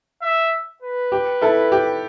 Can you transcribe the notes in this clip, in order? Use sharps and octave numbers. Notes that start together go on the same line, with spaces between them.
E5
B4
G4
E4 A4
G4